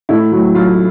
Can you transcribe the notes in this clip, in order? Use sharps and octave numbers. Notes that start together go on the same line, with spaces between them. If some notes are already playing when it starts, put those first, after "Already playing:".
A2 E4
F#3
F#3 F4